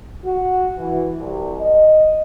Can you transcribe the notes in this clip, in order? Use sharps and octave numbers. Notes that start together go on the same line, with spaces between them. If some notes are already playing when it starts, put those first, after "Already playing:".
F#4
E3
C2
D#5